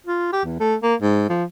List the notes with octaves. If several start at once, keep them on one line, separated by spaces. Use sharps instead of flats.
F4
G4
E2
A3
A#3
G#2
F3